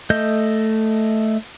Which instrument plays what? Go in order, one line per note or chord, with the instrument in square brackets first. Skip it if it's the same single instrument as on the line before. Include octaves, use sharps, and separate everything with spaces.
[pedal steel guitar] A3 D#5 G6